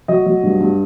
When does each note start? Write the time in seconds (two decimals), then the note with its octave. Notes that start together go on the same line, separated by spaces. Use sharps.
0.08 F#3 D#5
0.26 F#3
0.43 G2
0.60 G2